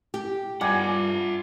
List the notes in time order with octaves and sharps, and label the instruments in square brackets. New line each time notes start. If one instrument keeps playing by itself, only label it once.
[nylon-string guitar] G4
[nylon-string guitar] G2 [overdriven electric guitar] F4 F#5 [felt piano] G#5 D6 G#6